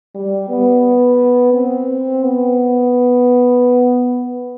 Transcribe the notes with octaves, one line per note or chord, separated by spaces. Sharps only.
G3
B3
C4
B3